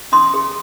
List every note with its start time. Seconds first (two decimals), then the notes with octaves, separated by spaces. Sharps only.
0.12 C#4 C6 D#6
0.34 G#4